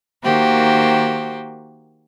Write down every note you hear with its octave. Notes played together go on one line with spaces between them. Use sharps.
D#3 A#3 F#4 G4 C5